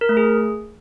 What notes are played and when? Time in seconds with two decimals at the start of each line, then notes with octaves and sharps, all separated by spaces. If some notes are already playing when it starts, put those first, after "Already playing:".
0.01 A#4
0.09 A3
0.17 G#4